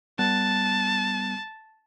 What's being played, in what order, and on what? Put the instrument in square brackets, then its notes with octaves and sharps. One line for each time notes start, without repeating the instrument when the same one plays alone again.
[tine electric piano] G3 B3 F#6 [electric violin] A5